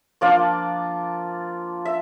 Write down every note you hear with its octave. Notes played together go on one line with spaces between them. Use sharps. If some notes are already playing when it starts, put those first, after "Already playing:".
F3 A#3 D4 F4 D5
E5